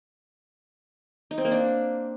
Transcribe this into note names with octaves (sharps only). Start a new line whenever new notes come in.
D#4
C4
A#3
D4